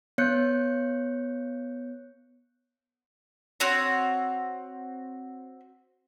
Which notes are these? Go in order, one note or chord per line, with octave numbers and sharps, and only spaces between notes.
B3 C#5 F#6 G6 C#7
C4 F#4 C#5